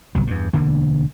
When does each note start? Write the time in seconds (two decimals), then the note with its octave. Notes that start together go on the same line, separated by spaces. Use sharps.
0.15 G1 C2 F#3
0.27 E2 G2
0.53 E1 D2 D3 A#3